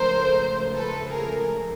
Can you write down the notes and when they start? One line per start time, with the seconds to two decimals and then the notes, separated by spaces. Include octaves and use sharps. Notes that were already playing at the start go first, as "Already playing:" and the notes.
Already playing: C#2 C#3 F3 A3 A#4 C5
0.75 A4 B4
1.11 G#4 A#4